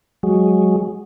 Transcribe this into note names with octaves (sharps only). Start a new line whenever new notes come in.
F#3 G#3